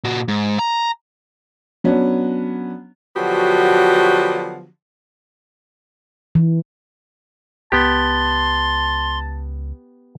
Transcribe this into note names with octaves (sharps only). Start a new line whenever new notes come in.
A#2 F#4
G#2
A#5
F#3 B3 C#4 D4
D3 F3 F#3 B3 F#4 G4
E3
C#2 B3 G4 A5 C6